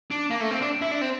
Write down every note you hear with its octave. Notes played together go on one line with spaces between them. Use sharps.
D4
A#3
A3
C4
D4
E4
D4
C4